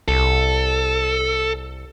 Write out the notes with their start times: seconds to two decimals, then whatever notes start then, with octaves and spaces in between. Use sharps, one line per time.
0.08 C2 A4